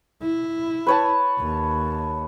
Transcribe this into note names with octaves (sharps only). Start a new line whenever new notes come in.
E4
B4 C#5 A5
D#2